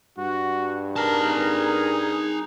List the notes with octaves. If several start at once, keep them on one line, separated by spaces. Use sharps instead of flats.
G2 F#4
D#4 G#4 A#4 A5 A#5